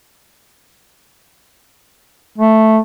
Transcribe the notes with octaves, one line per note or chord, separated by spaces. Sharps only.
A3